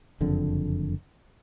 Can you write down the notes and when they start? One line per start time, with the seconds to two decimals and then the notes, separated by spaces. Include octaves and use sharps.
0.21 F#1 F2 D3